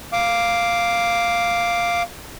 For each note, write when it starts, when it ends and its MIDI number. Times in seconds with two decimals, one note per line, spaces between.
0.13 2.03 77
0.13 2.03 86